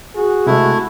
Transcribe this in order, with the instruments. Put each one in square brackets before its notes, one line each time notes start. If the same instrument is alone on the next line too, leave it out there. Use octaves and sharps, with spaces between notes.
[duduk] F#4 [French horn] G#4
[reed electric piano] C3 G#3 [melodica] A3 E4